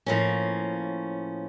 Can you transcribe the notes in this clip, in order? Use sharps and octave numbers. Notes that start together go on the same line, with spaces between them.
A2 F3 A#3 C#4